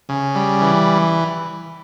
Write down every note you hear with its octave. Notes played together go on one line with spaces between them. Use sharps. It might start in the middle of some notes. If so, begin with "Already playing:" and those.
C#3
G3
E3